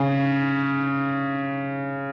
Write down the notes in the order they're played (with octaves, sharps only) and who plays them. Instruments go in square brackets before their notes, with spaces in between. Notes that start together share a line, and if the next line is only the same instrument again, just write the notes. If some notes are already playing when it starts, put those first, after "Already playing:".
Already playing: [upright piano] C#3